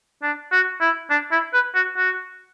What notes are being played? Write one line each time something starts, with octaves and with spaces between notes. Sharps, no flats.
D4
F#4
E4
D4
E4
B4
F#4
F#4